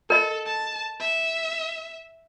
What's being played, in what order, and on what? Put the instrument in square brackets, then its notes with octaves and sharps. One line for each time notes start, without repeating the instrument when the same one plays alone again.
[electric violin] A4 [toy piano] A#4 D#5
[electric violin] A5
E5